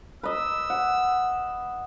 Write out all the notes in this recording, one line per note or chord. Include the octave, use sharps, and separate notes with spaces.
B4 D#5 E6
F#5